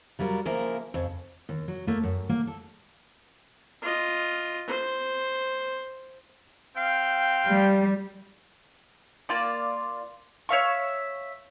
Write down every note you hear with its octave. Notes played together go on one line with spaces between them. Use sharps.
F#3 G3 F4 F#4 A#4
C#3 F3 A#3 E4 A#4
F2 C#3
D#2
F#3
A3 A#3
F#2
A#3
A4
F4 D#5
C5
C4 F5 G5
G3
A#3 F4 D5
C#5 E5 F5 C#6